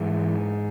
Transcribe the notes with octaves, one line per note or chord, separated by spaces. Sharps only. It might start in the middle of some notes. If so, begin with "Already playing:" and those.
Already playing: G#2 E3